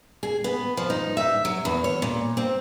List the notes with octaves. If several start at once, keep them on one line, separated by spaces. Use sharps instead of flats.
G#4
B3
F3
D#4
E5
F#3
E2
C#5
A#2
C4